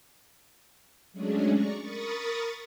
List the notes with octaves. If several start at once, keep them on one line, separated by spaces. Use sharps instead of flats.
F#3 G#3 A3 C#4 D4 G#4
D5 A#5 C#6
A#4 B5 C#6 D#6 A6